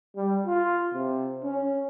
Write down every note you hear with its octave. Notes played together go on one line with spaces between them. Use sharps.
G3
F4
C3
C#4